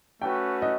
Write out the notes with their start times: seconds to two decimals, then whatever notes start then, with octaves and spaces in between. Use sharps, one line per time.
0.21 A3 C#4 F#4 B4 G5
0.62 D#5